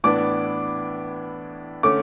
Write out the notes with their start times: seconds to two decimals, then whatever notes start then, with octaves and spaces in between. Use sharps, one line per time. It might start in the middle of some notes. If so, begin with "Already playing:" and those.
0.04 A2 E3 B3 D4 D6
1.83 D3 A3 C#4 D6